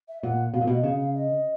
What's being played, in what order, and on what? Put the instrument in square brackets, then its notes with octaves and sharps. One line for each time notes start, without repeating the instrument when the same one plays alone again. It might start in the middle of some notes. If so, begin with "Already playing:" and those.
[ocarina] E5
[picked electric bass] A#2 [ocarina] F#5
[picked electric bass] B2 [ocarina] F5
[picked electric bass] A#2
[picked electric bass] B2 [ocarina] D#5
[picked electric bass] C#3 [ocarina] F5
[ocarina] F5
D#5